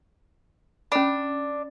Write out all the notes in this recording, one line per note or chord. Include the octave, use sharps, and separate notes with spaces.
C#4 D4 B5